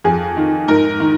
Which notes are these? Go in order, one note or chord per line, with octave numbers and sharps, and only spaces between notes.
F2 G#4
D#3
G#2 A#4
D#3